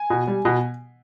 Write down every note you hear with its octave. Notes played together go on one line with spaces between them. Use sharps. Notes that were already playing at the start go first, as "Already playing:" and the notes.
Already playing: G#5
B2
G3
B2